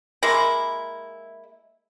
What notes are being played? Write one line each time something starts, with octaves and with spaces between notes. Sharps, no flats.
G#3 A#3 E4